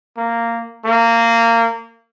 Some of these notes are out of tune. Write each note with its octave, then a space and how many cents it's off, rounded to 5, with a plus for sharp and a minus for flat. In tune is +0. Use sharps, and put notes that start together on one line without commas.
A#3 -10
A#3 -20